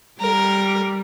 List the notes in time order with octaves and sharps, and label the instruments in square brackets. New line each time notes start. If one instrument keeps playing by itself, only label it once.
[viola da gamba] G3 [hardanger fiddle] A#4